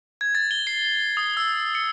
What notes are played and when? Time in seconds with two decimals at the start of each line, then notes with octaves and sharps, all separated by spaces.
0.21 G#6
0.35 A6
0.51 G7
0.67 C7
1.17 D#6
1.37 E6
1.75 C#7